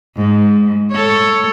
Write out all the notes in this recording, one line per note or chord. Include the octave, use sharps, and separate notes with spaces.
G#2
A4 C#5